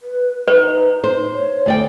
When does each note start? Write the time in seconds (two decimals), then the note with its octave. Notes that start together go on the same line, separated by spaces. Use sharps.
0.01 B4
0.48 D#4 B4
1.04 C5
1.32 C#5
1.66 D2 D5 G5